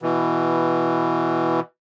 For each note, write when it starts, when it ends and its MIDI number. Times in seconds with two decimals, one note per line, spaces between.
0.02 1.60 47
0.02 1.60 52